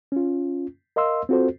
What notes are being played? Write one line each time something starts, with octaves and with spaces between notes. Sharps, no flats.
C#4 F4
A#4 D#5 F5 C6 E6
C4 F4 F#4 A4 C5